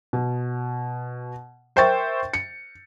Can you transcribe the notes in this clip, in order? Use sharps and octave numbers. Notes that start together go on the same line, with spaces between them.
B2
A#4 C5 E5 G5 C#6 A6
C#7